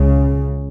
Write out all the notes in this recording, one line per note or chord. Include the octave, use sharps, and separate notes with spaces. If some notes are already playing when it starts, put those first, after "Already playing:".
Already playing: C#2 C#3